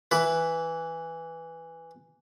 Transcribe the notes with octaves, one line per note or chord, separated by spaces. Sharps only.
E3 B4